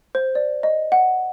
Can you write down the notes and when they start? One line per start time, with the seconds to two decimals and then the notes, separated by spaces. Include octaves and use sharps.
0.15 C5
0.35 D5
0.63 D#5
0.92 F#5